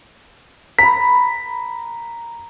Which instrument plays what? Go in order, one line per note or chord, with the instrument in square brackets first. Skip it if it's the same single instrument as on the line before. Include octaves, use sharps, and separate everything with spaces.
[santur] A#5 B5 [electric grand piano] B6